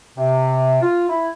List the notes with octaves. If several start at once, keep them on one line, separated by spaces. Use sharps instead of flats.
C3
F4
E4